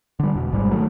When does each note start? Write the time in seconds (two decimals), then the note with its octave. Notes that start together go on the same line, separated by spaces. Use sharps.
0.19 D3 G3
0.34 E1 B2
0.52 G#1 G#2 G3 G#3
0.71 D#3 F#3 A3